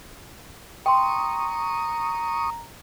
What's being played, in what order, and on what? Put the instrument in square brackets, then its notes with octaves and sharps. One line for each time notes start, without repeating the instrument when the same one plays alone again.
[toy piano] G5 C6 [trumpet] A#5 [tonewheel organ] C#6 D#6